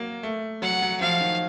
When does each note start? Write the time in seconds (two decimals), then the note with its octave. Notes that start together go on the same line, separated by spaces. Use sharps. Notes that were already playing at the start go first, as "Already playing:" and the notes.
Already playing: F#3 A#3
0.23 A3
0.62 F#3 F#5
0.82 F#3
1.01 F3 F5
1.21 D#3